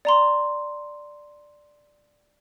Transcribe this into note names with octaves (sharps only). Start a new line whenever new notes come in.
D5 A#5 C6